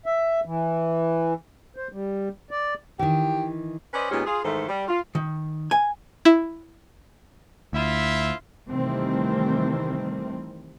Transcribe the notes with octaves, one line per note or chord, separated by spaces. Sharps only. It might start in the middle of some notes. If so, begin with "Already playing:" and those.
E5
E3
C5
G3
D5
D#3 E3 G4
C#4 B4 C5 D5 D#5
A#2 G#3 B3 C#4 D#4 G4
F4 G#4
G#2 D#3 E3 A3 A4 C5
G3
F4
D#3
G#5
E4
D2 E4 F4 E5
C3 D#3 E3 G3 A3 C4